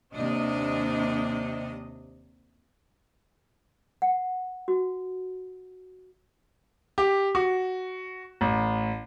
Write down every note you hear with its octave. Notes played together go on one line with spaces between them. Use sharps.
D#2 C3 D4 D#5
F#5
F#4
G4
F#4
A1